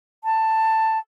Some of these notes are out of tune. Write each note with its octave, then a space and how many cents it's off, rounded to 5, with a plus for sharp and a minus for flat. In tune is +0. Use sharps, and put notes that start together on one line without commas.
A5 +10